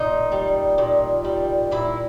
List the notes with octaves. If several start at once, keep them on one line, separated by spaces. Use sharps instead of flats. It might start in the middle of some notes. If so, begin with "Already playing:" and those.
Already playing: A#2 D#4
G3
A#2
G3
A#2 E4